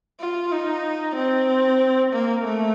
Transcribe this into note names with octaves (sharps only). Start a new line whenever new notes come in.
F4
D#4
C4
A#3
A3